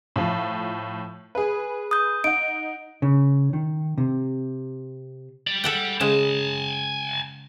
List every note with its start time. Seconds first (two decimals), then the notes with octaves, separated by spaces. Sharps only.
0.16 A2 F3
1.35 G#4 B4
1.91 D#6 G6
2.24 D#4 F#5 D7
3.02 C#3
3.53 D#3
3.98 C3
5.47 G3 D5
5.64 A4 F#5 G5
6.00 C#3 G#3 G#5 A5